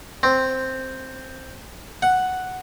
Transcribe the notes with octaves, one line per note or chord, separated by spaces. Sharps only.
C4
F#5